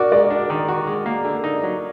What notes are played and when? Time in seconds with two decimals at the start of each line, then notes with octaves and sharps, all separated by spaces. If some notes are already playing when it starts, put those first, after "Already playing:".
Already playing: F#4 A#4 D5
0.12 G#3 D5
0.30 D4
0.50 D#3
0.68 F#4
0.87 G#3
1.06 A#3
1.25 D3
1.44 D#4
1.63 F#3